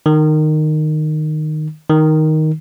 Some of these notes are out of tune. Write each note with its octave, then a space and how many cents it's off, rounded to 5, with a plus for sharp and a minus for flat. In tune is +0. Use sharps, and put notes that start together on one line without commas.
D#3 -15
D#3 +5